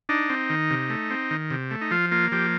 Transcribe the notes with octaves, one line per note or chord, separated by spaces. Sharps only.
D4 D#4
C4
D#3
C3
A3
C4
D#3
C3
A3
D#4
F3 F4
A#3 F4
F3 G4